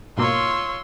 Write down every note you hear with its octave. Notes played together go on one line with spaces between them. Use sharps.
G#2 B2 A#3 F4 C#5 C6 E6